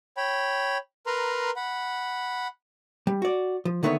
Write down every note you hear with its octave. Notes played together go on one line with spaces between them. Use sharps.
C#5 G5 B5
A#4 B4 A#5 C6
F#5 B5
G3
F#4 D5
F3
D3 D#3 A3 B3 B4 C#5